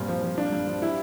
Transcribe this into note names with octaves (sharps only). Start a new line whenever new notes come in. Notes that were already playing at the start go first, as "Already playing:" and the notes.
Already playing: G2 A#2 C4
F3
F3
F3 D4
G2
F3
G3 E4